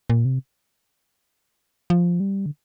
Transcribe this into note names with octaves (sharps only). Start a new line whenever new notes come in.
A#2
C3
F3
G3
D3